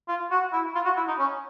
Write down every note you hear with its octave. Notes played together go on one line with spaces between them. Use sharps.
F4
F#4
E4
F4
F#4
E4
D#4
C#4